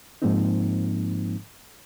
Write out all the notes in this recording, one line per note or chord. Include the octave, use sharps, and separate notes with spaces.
G#2 F3 G#3 A#3 C4 D#4